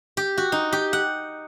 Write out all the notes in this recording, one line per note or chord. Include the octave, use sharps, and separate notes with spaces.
G4
F#4
D#4
G4
F#5